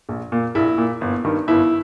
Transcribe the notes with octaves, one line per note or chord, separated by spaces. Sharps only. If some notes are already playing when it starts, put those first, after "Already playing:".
A#1
A#2
A#1 E4
A#2
G1
G2 D#3
G1 E4